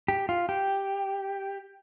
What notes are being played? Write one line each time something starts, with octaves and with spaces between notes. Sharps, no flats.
G4
F4
G4